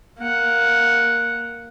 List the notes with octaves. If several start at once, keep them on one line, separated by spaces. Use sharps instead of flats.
A#3 F#5